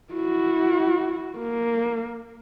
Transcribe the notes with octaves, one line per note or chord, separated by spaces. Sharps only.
E4 F#4
A#3